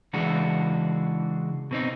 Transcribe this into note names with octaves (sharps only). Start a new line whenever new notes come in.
C#3 E3 G#3 D4 F#4
B2 C4 D#4